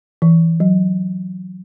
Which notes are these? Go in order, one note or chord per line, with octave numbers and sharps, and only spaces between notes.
E3
F#3